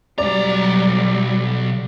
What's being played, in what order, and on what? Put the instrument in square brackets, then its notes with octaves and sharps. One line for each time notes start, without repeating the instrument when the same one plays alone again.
[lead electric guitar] B1 A#5 [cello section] F#3 G3 [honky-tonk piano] D5